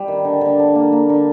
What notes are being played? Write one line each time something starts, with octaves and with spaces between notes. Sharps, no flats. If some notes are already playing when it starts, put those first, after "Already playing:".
Already playing: G3
D#3
D3
D3
D3
A#3
A#3
D3